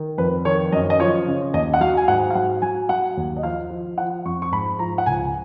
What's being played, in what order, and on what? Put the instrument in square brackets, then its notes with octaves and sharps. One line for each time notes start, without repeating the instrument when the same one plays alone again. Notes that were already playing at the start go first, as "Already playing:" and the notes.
Already playing: [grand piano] D#3
F2 B4
D#3 C#5
F#2 D#5
D#5
F3 C#5
C#3
D#2 D#5
F#5
F#3 F5
G#5
G#2 F#5
F5
F#3 F#5
F#3 G#5
F#3 F#5
D#2
D#5
F3 F5
F3
F3 F#5
F2 C#6
C#6
G#2 B5
F3 A#5
F#5
C#2 G#5